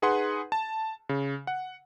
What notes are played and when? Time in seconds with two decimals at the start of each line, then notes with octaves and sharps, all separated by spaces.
0.02 D#4 G#4 B4 F#5 C6
0.52 A5
1.09 C#3
1.47 F#5